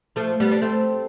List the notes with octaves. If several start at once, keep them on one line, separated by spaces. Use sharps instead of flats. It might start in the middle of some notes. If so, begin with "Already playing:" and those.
F3 A3
G3 B3
D4
A3 C4